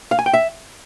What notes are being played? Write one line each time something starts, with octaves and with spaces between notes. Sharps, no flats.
F5
G#5
G5
E5